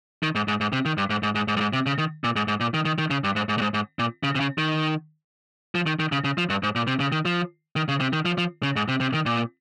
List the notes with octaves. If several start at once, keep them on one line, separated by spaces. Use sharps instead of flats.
D#3
G#2
G#2
G#2
C3
D#3
G2
G#2
G#2
G#2
G#2
G2
G#2
C3
C#3
D#3
A#2
G#2
G#2
A#2
D#3
D#3
D#3
C#3
G2
G#2
G#2
A#2
G#2
G#2
A#2
C#3
C3
C#3
D#3
F3
D#3
D#3
C#3
C#3
F3
G2
G#2
A#2
C3
C#3
D#3
F3
D#3
C#3
C3
D#3
F3
F3
C#3
G#2
C3
C3
D#3
A#2